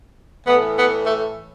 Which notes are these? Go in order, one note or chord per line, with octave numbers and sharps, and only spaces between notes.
A2 E3 B3
B3
A3